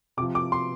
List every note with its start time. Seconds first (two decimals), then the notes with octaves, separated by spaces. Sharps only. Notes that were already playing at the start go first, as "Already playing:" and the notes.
0.17 C3 D6
0.22 F3
0.35 D6
0.52 C6